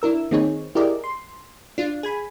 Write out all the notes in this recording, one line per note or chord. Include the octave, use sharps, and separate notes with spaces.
D4 E4 A#4 E6
D#3 A#3 C4 D#4 G#4 C#5
E4 G4 G#4 A#4 D5 D#5
C6
D4 F4
G#4 G#5 B5